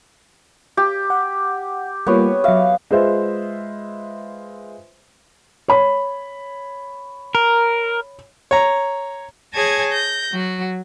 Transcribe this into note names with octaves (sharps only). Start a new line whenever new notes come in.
G4
F#5
G3 A#3 B3 F4 C#5
F#3 E5 F5
G#3 F4 G#4 B4 C5 E5
C#5 B5
A#4
C#5 A#5
G#4 C#5 G#5 A5 G#6 A#6
G6 A#6
F#3 F#4